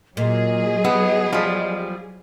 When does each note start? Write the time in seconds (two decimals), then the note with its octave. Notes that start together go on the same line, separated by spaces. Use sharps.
0.17 A#2 F#3 G#4 D#5
0.84 B3 E4
1.33 F3 G3